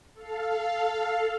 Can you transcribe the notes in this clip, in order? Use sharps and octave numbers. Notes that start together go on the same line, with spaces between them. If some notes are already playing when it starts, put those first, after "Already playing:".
A4 F5